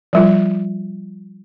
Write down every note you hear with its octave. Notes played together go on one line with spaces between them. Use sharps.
F3 G3 F4